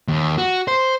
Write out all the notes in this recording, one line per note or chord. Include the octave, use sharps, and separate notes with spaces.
D#2
F#4
C5